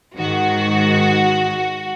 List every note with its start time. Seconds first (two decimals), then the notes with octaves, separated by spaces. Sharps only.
0.17 G#2 D#3 F#4